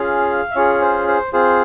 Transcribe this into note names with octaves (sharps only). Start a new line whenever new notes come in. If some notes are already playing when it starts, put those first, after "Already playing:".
Already playing: C#4 F4 G#4 F5
E5
C#4 F4 G#4 C#5
C5
C5
C4 F4 G#4 C5